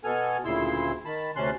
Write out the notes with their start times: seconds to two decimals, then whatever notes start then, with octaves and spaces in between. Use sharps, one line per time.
0.04 B2 B3 A4 G#5 F6
0.45 D2 A#2 C#3 E4 C6 E6
1.05 D#3 A5 B5
1.36 D2 C3 C#4 A5 C6 F#6